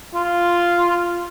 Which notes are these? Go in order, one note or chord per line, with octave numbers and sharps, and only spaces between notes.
F4